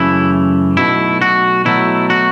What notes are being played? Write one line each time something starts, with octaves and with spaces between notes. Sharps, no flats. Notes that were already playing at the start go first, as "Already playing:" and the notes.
Already playing: F#2 C#3 E3 A3 E4
B1 B2 A3 E4
F#4
B2 F#3 A3 E4
F#4